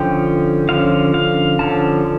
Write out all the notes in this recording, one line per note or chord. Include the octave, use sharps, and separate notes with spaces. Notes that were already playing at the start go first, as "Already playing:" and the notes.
Already playing: D3 F3 C#4 G5
D3 F3 C#4 F5
F5
D3 F3 C#4 A5